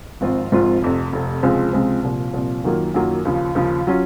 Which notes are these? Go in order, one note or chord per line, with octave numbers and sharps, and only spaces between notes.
G#1 G#2 F3 C4 F4
G#1 G#2 F3 C4 F4
F1 F2 C3
F1 F2 C3
C#2 C3 F3 G#3 C4
C#2 C3 F3 G#3 C4
C2 A#2 F3
C2 A#2 F3
F#2 D#3 F#3 A#3 F4
F#2 D#3 F#3 A#3 F4
D#2 C#3 F3
D#2 C#3 F3
F#3 C#4 F4